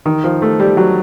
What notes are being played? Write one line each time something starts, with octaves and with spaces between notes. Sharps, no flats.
D#3
F3
A3
G3
F#3